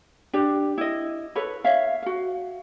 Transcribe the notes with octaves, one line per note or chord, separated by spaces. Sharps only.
D4 G4 D5
E4 D#5
A4 B4 C#5 B5
C#5 E5 F5
F#4 F5